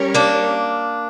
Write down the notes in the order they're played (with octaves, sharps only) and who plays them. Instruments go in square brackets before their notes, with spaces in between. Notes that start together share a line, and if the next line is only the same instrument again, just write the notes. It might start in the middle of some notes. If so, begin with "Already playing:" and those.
Already playing: [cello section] G3 C#4 G4 A#4 C#5
[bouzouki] A#3 D4